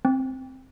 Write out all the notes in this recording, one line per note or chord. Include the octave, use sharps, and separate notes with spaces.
C4